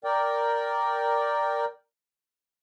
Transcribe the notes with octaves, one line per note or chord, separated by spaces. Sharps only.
A#4 D5 G5